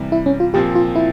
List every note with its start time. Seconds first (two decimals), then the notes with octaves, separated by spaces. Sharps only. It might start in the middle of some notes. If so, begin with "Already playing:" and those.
Already playing: C3 E3 G3
0.12 E4
0.26 C#4
0.40 F4
0.54 A#2 F3 C4 G4
0.75 F4
0.96 E4